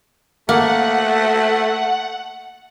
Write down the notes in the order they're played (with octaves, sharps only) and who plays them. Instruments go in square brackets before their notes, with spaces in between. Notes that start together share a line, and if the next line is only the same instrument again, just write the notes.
[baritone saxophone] A3 [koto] A#3 [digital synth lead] F#5